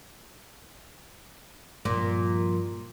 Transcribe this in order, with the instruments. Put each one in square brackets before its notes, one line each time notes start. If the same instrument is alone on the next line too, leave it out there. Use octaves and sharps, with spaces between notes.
[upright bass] G2 F3 [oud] A#2